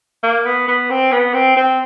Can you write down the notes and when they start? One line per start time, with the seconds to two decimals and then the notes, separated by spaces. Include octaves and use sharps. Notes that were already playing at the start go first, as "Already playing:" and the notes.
0.23 A#3
0.46 B3
0.68 B3
0.90 C4
1.12 B3
1.34 C4
1.57 C4